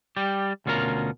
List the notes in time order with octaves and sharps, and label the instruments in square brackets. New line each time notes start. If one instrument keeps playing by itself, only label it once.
[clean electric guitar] G3 G4
D2 B2 C#4 F4 A#4 A#5